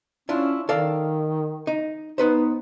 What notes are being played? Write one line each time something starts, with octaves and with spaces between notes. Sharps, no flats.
C#4 D4 E4 F4
D#3 A4 D5 F5
D#4
B3 D#4 B4 C5